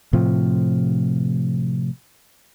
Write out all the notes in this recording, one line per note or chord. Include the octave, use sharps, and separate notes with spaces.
A2 C3 F3